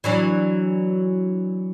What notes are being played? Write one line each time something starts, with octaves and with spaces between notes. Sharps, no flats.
E3 F#3 D4